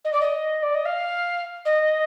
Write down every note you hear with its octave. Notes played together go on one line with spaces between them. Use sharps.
D#5
D5
D#5
D5
D#5
F5
D#5